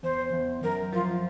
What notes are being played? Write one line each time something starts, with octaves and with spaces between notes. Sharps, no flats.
E2 C5
E2
F#2 A#4
F3 F4